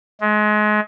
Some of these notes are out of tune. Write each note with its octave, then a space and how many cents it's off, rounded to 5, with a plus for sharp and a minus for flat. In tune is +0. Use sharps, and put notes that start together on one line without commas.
G#3 +30